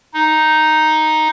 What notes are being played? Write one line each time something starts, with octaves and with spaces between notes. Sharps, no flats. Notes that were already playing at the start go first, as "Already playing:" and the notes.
D#4